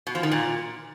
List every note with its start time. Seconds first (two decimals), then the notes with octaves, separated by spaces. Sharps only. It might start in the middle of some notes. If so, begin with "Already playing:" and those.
0.07 B2
0.15 F3
0.23 D#3
0.32 A#2